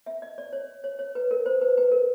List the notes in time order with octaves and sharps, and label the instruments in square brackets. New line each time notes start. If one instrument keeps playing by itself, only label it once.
[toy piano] E5
D#5
D5
C#5
C#5
C#5
B4
A#4
C5
B4
B4
A#4